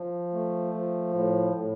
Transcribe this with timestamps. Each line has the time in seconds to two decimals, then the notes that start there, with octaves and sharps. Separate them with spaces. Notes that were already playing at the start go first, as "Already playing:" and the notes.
Already playing: F3
0.33 A3
0.74 F3
1.14 A2
1.54 A2